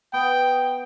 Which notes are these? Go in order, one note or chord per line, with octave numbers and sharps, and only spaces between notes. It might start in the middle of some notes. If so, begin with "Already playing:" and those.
B3 G5